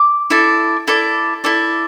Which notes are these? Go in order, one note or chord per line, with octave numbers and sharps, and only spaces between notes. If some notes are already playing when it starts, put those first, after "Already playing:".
Already playing: D6
E4 A4 D5
E4 A4 D5
E4 A4 D5